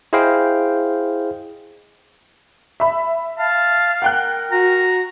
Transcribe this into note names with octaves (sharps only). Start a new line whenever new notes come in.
E4 G#4 C5 D#5 F5 G5
E5 B5
F5 A5
A#4 F#5 G5 F#6
F#4 A#5